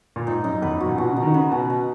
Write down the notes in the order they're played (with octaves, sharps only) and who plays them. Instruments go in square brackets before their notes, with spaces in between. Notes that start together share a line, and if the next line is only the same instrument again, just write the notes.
[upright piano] A#2
[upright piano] G#2 [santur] D#4
[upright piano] F#2 [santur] D#4
[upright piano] E2 [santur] B4
[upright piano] F#2
[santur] F#4
[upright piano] A#2
[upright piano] B2 [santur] F#4
[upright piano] C#3
[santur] D#4
[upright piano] D#3
[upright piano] C#3 [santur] B4
[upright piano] B2 [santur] F#4
[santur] D#4